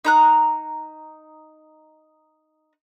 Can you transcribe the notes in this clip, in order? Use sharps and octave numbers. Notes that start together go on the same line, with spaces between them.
D#4 A#5 F#6